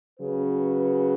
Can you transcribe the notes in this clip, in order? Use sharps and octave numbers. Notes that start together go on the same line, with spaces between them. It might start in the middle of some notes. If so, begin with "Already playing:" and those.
C#3 F#3 B4